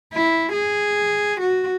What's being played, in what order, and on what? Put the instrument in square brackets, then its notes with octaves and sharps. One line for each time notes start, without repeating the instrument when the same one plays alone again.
[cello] E4
G#4
F#4